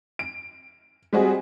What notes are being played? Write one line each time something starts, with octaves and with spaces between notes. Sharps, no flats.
D7
G3 G#3 C4 F#4 G#4 D#5